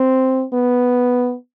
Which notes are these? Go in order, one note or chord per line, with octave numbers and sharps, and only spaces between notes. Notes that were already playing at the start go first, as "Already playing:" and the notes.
Already playing: C4
B3